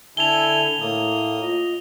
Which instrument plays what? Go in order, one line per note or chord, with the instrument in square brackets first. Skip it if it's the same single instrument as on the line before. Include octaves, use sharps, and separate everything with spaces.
[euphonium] D3 [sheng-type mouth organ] E4 A4 G#5 [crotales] F7 G7
[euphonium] A2 [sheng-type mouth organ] A#3 D#6
[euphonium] F4 [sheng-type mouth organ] D#5